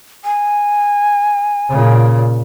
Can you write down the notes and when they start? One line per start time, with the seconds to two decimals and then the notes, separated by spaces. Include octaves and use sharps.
0.25 G#5
1.69 A#2 C#3